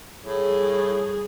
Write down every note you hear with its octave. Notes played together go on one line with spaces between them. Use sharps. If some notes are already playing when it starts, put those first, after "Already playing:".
A2 G3 G#4